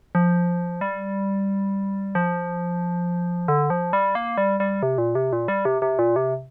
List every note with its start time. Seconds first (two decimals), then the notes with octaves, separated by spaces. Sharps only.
0.15 F3
0.81 G3
2.15 F3
3.48 D3
3.70 F3
3.93 G3
4.15 A#3
4.38 G3
4.60 G3
4.83 C3
4.98 A#2
5.15 C3
5.33 A#2
5.48 G3
5.65 C3
5.82 C3
5.99 A#2
6.16 C3